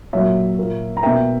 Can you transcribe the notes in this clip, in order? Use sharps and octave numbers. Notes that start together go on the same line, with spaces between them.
A#2 F#3 A#3 C#5 E5
A#2 A#3
A#5
B2 A#3 E5 G5